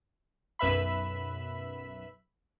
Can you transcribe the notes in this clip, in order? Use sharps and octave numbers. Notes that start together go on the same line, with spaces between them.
B1 F#2 B4 E5 B5